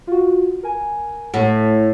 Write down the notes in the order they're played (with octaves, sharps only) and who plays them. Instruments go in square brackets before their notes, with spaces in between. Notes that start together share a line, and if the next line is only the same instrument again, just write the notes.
[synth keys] F4 F#4
A#4 G#5
[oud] A2 [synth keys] A3 F#5